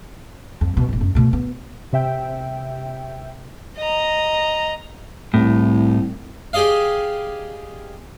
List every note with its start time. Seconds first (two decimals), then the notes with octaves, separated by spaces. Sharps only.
0.61 F2
0.74 A#1 B2
0.89 E1 A2
1.01 F#2
1.15 B2 A3
1.33 B3
1.93 C3 E5 G5
3.77 D#5 A#5
5.34 C2 A2
6.53 G4 G#4 D5 D#5 F5